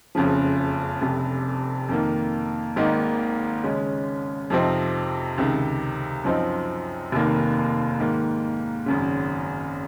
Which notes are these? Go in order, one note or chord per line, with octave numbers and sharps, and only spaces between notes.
F#1 F2 C#3 F3
F1 F2 C3
F2 D#3 A#3
G#1 G#2 D#3 A#3 D#4
D#2 C#3 G#3 C#4
F2 C3 F3 C4 D#4
C#2 C3 D#3
F#2 F3 C4 D#4
F1 D#2 D#3 A#3
G#2 D#3 A#3
G#1 F#2 C#3